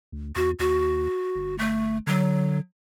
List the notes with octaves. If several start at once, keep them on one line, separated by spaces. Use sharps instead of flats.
D2
E2 F#4
D#2 F#4
G1
A3
D3 F#3